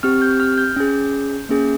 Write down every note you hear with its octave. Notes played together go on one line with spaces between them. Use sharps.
C4 G4 F6
G6
F6
G6
C#4 G#4
A#3 C#4 G#4